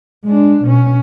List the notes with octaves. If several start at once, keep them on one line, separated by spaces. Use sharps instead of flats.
G#3 D4
B2 C#4